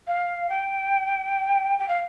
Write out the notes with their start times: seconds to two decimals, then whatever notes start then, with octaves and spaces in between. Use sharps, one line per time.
0.07 F5
0.50 G5
1.79 G5
1.88 F5